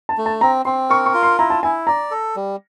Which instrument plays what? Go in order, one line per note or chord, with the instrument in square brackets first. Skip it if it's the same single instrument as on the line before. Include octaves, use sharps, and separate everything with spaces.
[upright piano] A5
[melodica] A3
[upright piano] A5
[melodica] C4 [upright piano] A#5
[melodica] C4 [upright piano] C6
[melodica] A#4 [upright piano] C#6
[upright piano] C#6
[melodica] F4
[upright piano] C6
[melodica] E4 [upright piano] A#5
[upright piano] A5
[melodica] E4 [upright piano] G#5
[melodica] D5 [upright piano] A#5
[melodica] A4
G3